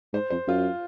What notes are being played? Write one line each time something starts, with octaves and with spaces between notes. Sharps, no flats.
G#2 C5
F2 C5
F#2 F4